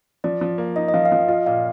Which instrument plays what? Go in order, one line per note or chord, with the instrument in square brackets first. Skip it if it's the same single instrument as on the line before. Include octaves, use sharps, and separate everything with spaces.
[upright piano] F3 [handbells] D5
[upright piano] F3
A#3
[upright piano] D#4 [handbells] D#5
[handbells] D#5
[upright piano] F3 [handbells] F5
[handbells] F5
[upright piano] F3 [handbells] D#5
[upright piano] F4 [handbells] D#5
[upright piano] A#2 [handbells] F5